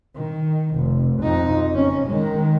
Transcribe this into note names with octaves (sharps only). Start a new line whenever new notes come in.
D#3
F1
F2 D#4
F#1 C#4
D#3 G#3